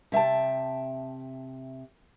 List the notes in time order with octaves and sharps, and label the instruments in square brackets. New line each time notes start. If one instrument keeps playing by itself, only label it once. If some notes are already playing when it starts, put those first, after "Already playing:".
[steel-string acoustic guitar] C3 E5 G5 A5